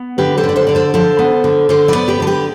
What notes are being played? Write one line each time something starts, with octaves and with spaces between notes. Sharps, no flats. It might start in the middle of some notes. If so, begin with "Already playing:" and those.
Already playing: B3
D3 G4 B4
A4 C5
D3
D5
A4 C5
D3 D5
A4 C5
F3 A4 C5
B3
D3
D3 A4 C5
B4 D5
B3
G4 B4
D3 A4
G4 B4